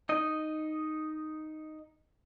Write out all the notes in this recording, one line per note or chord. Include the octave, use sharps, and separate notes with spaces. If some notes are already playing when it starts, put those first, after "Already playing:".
D#4 D#5